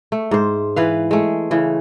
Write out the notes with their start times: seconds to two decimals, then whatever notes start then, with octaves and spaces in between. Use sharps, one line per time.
0.12 A3
0.31 G#2 C5
0.76 E3 B4 F5
1.11 G#3 A3
1.51 C#3 E3